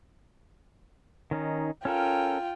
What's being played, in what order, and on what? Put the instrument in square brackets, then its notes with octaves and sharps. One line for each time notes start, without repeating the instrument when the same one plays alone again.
[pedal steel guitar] D#3 C#4 D#4
[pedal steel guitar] C#4 A4 A#4 [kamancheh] F4 G5